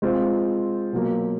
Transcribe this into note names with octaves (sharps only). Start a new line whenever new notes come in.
G#3 C4 F4
B2 F#3 A#3